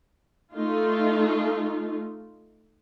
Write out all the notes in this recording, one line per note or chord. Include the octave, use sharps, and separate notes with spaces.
A3 D#4 F4